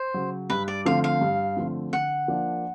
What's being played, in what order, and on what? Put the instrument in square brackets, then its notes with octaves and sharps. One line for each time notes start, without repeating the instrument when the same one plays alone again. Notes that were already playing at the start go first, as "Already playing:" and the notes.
Already playing: [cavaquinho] C5
[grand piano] C#3 F#3
[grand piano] G2 [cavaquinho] B4
[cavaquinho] D5
[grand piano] D3 F3 A3 C4 [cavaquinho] F5
[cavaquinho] F5
[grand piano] G2
D3 F3 A3 C4
[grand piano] D3 [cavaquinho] F#5
[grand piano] F3 A#3 D4